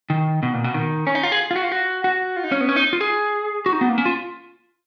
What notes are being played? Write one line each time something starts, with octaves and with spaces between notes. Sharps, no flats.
D#3
B2
A#2
B2
D#3
C#4
D#4
F4
G#4
F4
F#4
F4
F#4
F#4
F4
D#4
C#4
B3
C#4
D#4
F4
G#4
F#4
D#4
B3
A#3
C#4
F4